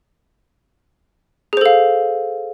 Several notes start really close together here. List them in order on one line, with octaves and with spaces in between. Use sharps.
G#4 C5 A4 F5